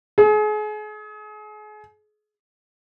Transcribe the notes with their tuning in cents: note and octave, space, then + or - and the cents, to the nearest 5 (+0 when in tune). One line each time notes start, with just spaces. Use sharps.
G#4 +35